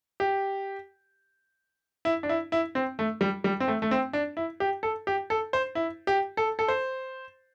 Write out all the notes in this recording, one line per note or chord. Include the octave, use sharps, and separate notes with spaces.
G4
E4
D4
E4
E4
C4
A3
G3
G3
C4
A3
A3
C4
D4
E4
G4
A4
G4
A4
C5
E4
G4
A4
A4
C5